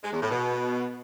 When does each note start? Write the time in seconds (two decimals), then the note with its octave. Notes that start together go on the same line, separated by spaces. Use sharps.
0.03 G#3
0.12 E2
0.21 A2
0.31 B2